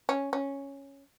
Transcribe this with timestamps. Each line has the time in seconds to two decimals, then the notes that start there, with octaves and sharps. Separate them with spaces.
0.09 C#4
0.33 C#4